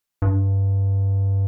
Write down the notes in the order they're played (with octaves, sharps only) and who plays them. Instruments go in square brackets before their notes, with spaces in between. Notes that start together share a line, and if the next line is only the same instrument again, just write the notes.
[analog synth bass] G2